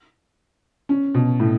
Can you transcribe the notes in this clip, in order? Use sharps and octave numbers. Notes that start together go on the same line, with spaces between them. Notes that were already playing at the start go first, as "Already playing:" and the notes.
C#4
B2
A2